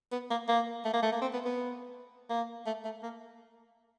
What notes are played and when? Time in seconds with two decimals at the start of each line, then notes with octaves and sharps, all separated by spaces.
0.12 B3
0.30 A#3
0.48 A#3
0.85 A3
0.94 A#3
1.03 A3
1.12 A#3
1.21 C4
1.33 B3
1.45 B3
2.30 A#3
2.66 A3
2.85 A3
3.03 A#3